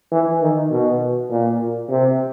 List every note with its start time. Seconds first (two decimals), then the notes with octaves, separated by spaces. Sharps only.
0.12 E3
0.41 D#3
0.71 B2
1.30 A#2
1.89 C3